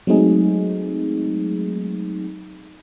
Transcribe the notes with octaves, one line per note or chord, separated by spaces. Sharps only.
F#3 G#3 A3 C4 D#4 G#4